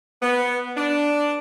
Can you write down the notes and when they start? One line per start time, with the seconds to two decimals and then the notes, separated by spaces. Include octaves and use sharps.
0.23 B3
0.77 D4